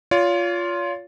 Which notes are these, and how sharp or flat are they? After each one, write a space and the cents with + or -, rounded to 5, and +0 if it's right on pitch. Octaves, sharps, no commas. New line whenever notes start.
F4 +0 C#5 +40